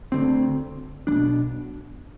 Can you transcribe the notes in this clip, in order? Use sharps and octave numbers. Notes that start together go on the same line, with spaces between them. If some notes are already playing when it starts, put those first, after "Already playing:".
D2 D3 F3 C4
B1 B2 G3 D4